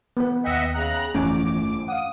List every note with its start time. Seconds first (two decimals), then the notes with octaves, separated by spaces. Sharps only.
0.17 B3 B4
0.45 D#2 D#5 E5 F#5 G5
0.75 C#3 A#5 F#6
1.15 G1 F2 E3 A3 C#4 D6
1.88 F5 F#5 D#6